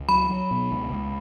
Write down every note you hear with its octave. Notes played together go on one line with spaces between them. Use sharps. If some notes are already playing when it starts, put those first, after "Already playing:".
Already playing: C#2
F#3 B5
F#3
B2
C#2
C#2